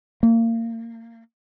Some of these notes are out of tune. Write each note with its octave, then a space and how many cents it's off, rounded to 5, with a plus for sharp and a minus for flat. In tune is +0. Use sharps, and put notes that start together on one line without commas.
A#3 -30